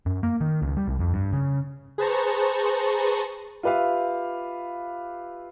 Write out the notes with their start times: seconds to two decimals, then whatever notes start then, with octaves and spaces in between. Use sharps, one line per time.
0.06 F#2
0.23 A#3
0.41 D#3
0.62 C#2
0.77 G3
0.88 C2
0.99 F2
1.14 G2
1.33 C#3
1.98 G#4 B4 C5 A5 A#5 C#6
3.63 F4 G4 B4 E5 F5